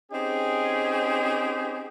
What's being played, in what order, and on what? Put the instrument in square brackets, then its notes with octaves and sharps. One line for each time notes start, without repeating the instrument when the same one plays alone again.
[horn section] C4 C#4 D#4 G4 G#4